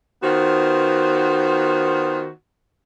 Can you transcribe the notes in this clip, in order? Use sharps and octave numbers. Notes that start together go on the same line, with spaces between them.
D#3 B3 F4 F#4 C5